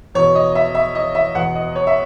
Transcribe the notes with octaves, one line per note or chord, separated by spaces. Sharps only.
E2 B2 C#5
D#5
E5
E5
D#5
E5
E2 B2 F#5
D#5
C#5
E5